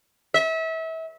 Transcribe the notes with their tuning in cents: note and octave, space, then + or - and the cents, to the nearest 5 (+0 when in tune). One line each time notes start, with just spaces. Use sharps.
E5 -30